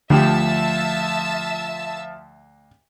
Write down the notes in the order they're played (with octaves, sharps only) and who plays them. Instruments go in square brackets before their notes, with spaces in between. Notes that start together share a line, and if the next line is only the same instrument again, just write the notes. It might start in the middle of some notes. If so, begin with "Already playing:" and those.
[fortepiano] D2 G4 [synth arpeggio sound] D3 [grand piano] F3 [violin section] E5 A5 E6